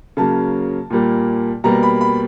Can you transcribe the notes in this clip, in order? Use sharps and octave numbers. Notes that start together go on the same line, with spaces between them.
C#3 F#3 A#3 A5
A#2 G3 A#3
B2 G3 A#3 A#5
B5
B5